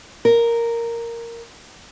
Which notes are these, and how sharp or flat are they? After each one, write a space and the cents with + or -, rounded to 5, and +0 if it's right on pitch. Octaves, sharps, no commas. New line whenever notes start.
A#4 -5